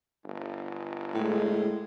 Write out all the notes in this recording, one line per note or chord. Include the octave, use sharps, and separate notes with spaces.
G1
A2 G#3